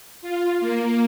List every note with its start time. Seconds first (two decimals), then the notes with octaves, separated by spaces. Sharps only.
0.22 F4
0.60 A#3